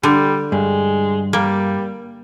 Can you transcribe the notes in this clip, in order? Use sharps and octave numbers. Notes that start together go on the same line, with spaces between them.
D3 G3
G2 G#3
G3 A#3